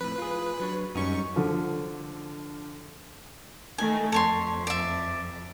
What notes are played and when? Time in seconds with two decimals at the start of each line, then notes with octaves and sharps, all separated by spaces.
0.01 F2 A2 B4
0.18 F4 G#4
0.60 F#3 D4 C#5
0.95 F#2 G3 C#4 D#4 C#6
1.36 D3 F3
3.78 D#3 A3 G#5
4.12 F2 A4 C#5 C6
4.67 D5 E5